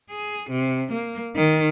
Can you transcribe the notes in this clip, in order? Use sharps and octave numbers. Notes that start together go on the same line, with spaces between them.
G#4
C3
A#3
D#3